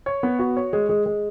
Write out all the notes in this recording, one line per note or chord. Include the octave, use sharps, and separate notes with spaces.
C#5
B3
F#4
C#5
G#3
G#3
G#3